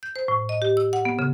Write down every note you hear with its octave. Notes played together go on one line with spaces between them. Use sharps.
G6
C5
A2
D#5
G4
E6
F#5
B3
C#3